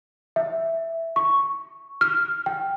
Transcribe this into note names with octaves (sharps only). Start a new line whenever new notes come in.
E5
C#6
F6
G5